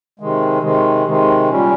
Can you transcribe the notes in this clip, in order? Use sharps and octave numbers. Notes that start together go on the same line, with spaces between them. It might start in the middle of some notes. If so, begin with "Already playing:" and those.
C3 D#3 G#3
C3 D#3 G#3
C3 D#3 G#3
A#2 G3 C#4